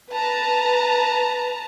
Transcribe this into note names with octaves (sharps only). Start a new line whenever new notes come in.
B4 A5 A#5